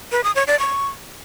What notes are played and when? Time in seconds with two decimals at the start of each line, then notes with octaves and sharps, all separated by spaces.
0.12 B4
0.24 D#6
0.36 C#5
0.47 D5
0.59 C#6